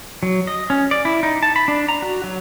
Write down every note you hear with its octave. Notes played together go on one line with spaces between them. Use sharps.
F#3
D#5
C#4
D5
E4
D#4
A5
B5
D4
A#5
F#4
F#3